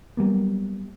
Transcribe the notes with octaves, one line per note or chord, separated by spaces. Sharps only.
F#3 G3 A#3 B3